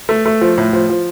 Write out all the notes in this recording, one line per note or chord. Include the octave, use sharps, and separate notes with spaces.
A3
A3
F3
A2
F3
F3